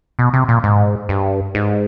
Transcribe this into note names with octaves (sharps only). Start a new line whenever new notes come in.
B2
C3
A#2
G#2
G2
G#2